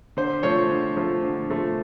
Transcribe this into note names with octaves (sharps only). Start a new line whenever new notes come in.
D3 C5
F3 A3 C#5
D3
F3 A3
D3
F3 A3